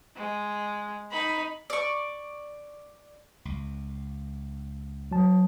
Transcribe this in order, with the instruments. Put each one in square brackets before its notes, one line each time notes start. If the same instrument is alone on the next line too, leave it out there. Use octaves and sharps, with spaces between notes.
[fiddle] G#3
D#4 B5
[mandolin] D5 C#6
[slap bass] C#2
[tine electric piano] F#3 A5